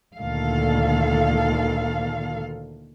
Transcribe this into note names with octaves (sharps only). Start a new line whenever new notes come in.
D2 A#2 D#3 A4 F5